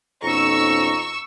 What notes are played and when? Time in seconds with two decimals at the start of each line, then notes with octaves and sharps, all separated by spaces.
0.23 F2 B2 C#4 D#4 A#5 C#6 E6